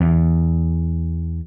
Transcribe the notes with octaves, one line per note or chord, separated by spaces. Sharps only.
E2